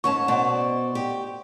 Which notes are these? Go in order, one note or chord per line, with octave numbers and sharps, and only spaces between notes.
G#2 C#4 A5 C#6
B2 C5 D5
G4